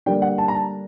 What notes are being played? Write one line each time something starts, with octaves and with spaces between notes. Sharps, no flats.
D3 G3 A#3 D4 G5
F#5
A5
A#5
A5